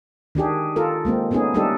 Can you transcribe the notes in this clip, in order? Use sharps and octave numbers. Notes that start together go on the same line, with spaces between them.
D#3 D4 G4 G#4
F4 A4 A#4
G#3 A#3 C4
A3 B3 C#4 D#4 G#4
G3 A3 D4 D#4 G4 A4